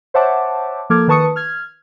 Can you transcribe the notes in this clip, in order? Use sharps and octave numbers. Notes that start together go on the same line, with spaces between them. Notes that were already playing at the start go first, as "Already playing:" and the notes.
C5 C#5 E5 F#5 A5 D6
F3 A#3 A4 D6 F6 G#6
D#3 B4 A5 C#6 D#6 C#7
F6 G#6